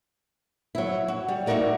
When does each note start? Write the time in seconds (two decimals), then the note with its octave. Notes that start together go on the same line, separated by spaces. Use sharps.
0.75 F#3 E4
1.08 F#4
1.28 G3
1.47 D#4 E4 F#4 A#4 D5